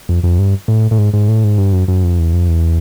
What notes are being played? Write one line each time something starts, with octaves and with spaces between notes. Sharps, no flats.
F2
F2
G2
A2
A2
G#2
G#2
A2
G#2
G2
F#2
F#2
F2
E2
F2
E2